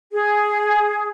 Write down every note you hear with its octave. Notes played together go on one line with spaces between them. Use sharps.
G#4